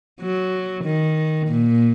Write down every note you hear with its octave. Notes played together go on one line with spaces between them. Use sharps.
F#3
D#3
A#2